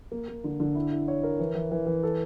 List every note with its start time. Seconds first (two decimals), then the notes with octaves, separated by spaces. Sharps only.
0.12 A#3
0.28 A#3
0.44 D3
0.60 D3
0.75 E4
0.92 E4
1.08 C#5
1.23 A#4
1.39 E3
1.55 E3
1.71 E3
1.86 E3
2.03 A4